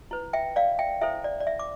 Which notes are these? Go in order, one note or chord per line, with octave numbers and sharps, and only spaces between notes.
E4 B4
E5 G5
D5 F5
E5 G5
E4 A4 C5 E5
D5
D5
E5
D6